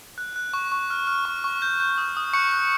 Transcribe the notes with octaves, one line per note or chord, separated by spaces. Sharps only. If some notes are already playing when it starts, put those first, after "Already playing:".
F#6
F#6
C#6
C#6
F6
F6
C#6
C#6
G6
G6
D#6
D#6
C#6 F#6 C#7
F#6